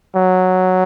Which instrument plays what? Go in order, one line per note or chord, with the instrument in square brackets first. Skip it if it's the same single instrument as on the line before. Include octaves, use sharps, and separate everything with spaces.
[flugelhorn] F#3